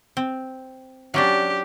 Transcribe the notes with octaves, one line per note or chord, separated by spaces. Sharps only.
C4
F#3 C#4 D4 G4